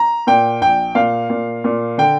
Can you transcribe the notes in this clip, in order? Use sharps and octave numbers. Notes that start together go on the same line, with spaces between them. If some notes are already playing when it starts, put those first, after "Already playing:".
Already playing: A#5
A#2 G5
A#1 G5
A#2 F5
A#2
A#2
D3 G5